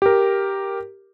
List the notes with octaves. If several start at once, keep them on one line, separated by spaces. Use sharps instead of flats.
G4 A#4